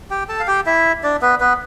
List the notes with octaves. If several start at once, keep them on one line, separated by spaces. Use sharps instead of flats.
G4 G5
A4 A5
F5
G4 G5
E4 E5
D4 D5
B3 B4
B3 B4